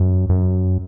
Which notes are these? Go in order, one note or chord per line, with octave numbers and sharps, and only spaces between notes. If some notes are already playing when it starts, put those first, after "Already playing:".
Already playing: F#2
F#2